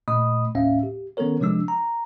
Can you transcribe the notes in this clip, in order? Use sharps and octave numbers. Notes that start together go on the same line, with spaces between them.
A#2 A3 D#5 B5 D#6
D#2 A2 C#4 E5 F5
G4
D#3 B3 C#4 A4 A#4 C#5
C3 F3 G#3 D4 E6
A#5